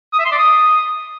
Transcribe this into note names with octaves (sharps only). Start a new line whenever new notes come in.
D#6
E5
C6
D5
D#6